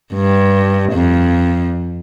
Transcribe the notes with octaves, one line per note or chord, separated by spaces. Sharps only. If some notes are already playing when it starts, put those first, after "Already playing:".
G2
F2